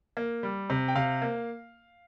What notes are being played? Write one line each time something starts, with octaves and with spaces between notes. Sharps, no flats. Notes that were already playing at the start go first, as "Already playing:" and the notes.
A#3
G3
C3
G5
C3 F5
A#3